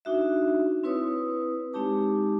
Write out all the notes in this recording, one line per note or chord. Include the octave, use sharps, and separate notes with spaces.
D4 D#4 F#4 E5
C4 E4 B4 C#5 D#6
G#3 C4 D#4 G4 A5 D6